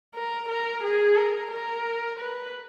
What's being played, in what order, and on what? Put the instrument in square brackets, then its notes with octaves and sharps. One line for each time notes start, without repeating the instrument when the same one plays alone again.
[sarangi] A#4
A#4
G#4
A#4
A#4
B4